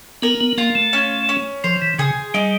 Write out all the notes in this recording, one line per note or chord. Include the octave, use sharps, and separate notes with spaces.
B3 A#4
B3
A#3 F4
A3
C#4
C#4
F3 C5
E3
C#3 G#4
G3 D#4